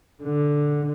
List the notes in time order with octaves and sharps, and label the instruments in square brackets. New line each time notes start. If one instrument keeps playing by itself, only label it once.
[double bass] D3